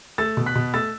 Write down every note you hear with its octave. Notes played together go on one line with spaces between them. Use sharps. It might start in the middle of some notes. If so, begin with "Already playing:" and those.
A3 E6 A6
B2
F#6 B6
B2
A3 E6 A6